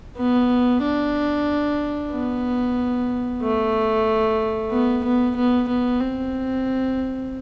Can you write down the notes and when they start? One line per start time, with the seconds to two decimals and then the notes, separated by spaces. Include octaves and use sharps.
0.17 B3
0.82 D4
2.12 B3
3.42 A3
4.71 B3
5.04 B3
5.36 B3
5.68 B3
6.00 C4